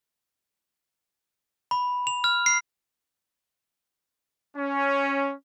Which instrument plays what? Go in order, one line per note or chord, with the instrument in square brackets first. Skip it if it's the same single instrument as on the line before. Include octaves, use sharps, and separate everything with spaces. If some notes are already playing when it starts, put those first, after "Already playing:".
[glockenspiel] B5
F7
F6
C7
[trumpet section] C#4